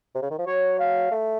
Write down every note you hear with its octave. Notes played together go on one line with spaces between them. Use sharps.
C3
C#3
D#3
F3
F#3 C#5
F5
A3